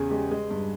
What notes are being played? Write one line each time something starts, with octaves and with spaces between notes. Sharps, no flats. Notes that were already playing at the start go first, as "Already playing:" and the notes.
Already playing: E2 C#3 G#4
G#3 G4
G#3
G2